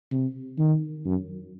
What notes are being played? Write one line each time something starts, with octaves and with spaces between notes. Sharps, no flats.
C3
D#3
F#2